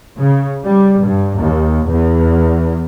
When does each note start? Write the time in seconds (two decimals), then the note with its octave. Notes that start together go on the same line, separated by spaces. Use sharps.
0.18 C#3
0.64 G3
1.01 G2
1.36 D#2
1.88 E2